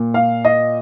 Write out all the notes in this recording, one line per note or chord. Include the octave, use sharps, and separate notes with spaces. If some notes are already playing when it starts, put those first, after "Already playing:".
Already playing: A#2 A#3
F5
D#5